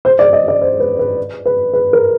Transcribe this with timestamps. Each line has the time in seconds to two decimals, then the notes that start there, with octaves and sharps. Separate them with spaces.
0.05 C5
0.19 D5
0.33 D#5
0.48 D5
0.61 C5
0.80 B4
0.99 B4
1.46 B4
1.73 B4
1.93 A#4